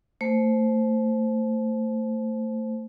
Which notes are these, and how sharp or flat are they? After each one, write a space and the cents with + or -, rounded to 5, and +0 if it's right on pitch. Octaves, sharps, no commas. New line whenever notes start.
A3 +30 C5 +0 A5 -35